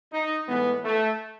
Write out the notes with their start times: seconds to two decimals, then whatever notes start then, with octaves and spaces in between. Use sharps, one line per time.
0.13 D#4
0.48 A2 E3 G#3 B3
0.84 A3